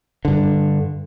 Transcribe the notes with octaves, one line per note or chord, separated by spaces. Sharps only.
G2 D3